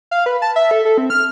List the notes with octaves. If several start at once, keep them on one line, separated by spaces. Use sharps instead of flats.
F5
B4
A5
E5
A4
A4
C4
F6